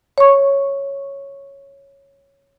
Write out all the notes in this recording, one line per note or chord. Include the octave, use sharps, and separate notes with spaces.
C#5 C#6